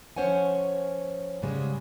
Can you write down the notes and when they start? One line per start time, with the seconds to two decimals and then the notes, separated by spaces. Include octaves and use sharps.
0.16 F3 C#4 C5 C#5 F#5 G#5
1.42 G#2 C#3 G3 G#3